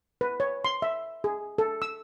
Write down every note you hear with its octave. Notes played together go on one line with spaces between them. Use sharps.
B4
C#5
C6
E5
G#4
A4
E6